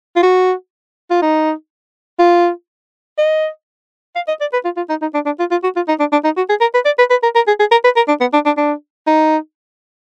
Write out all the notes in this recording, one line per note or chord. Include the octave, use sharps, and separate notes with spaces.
F4
F#4
F4
D#4
F4
D#5
F5
D#5
D5
B4
F4
F4
D#4
D#4
D4
D4
F4
F4
F#4
F4
D#4
D4
D4
D#4
F#4
G#4
A#4
B4
D5
B4
B4
A#4
A#4
G#4
G#4
A#4
B4
A#4
D4
B3
D4
D4
D4
D#4